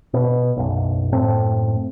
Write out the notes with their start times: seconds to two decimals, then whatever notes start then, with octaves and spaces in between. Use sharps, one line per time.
0.14 B2
0.57 F#1 B1
1.12 F#1 A2 A3 C4